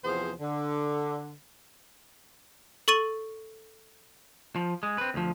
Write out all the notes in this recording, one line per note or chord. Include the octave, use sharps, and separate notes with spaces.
E2 C3 F3 B3 G#4 C5
D3
A4 C#6 A6 D#7 F#7
F3
G#3
C4 B4
D2 F3